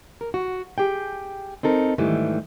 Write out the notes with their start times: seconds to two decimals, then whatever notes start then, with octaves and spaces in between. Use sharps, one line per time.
0.21 A#4
0.34 F#4
0.78 G4 G#4 G5
1.63 C4 D#4 A4 A#4
1.98 G#2 D#3 E3 G3 A3